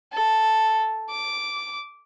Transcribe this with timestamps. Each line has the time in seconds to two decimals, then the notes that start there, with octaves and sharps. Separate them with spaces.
0.12 A4
1.10 D6